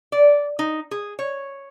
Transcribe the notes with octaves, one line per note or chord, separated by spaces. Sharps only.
D5
D#4
G#4
C#5